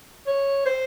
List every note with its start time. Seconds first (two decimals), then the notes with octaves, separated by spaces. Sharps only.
0.27 C#5
0.66 C5